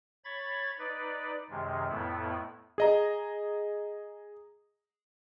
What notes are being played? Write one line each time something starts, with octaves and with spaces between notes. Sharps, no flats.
C#5 B5 G#6 A6
D#4 B4 D5
F#2 C3 D#3 G#3
F2 A2 A3 B3 E4
G#4 D#5 A#5